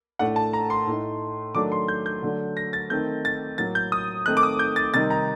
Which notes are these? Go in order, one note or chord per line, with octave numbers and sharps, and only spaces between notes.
A2 A3 D4 F#5
A5
A#5
C6
A2 A3 D#4
D#3 F#3 A3 D4 D6
C6
G6
G6
D3 F#3 A3 D4
A#6
A6
D#3 A3 C4 D#4 G6
A6
A2 F#3 A#3 A6
G6
D#6
D#3 A3 C4 D#4 F#6
D6
D#6
G6
A6
C3 D#3 G3 C4 D#4 A6
A#5